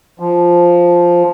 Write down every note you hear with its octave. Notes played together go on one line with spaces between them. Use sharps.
F3